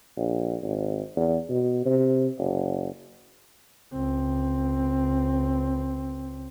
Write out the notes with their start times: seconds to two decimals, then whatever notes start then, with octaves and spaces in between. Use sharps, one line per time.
0.17 A#1
0.63 G#1
1.16 E2
1.49 B2
1.86 C3
2.39 F#1
3.93 C#2 C4